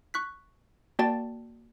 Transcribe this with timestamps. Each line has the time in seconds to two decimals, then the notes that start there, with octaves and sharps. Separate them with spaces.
0.14 C#6 F#6 B6
0.99 A#3 F#4 D5 G5 A5 A6